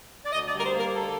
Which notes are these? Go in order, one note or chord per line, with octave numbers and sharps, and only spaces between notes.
D5
D2 D#5
D5
G3 A#4
C5
A#3
A#4
D3 A4